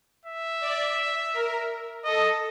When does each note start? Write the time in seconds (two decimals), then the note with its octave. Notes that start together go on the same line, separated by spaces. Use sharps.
0.26 E5
0.61 D5
1.34 A#4
2.05 A4 D#5